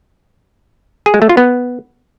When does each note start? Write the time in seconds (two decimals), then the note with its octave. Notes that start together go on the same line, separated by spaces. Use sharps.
1.06 G#4
1.14 G#3
1.22 A3
1.29 F4
1.37 B3